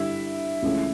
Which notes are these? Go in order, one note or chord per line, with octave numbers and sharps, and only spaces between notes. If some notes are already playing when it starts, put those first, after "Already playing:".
Already playing: G2 D3 G3 E4 E5
C#2 C#3 E3 A3 C#4